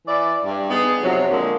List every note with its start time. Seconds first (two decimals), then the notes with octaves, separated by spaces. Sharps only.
0.07 E3 E4 D5
0.45 G2
0.70 B3 D#4 G#4
1.02 F2 C3 F#3
1.30 D3 G#3 A#3